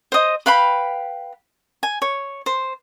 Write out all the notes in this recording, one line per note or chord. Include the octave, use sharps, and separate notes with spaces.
C5 D#5
B4 F5 G5 B5
G#5
C#5
C5